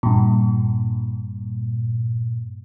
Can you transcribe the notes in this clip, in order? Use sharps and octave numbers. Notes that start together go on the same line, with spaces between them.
G2 A#2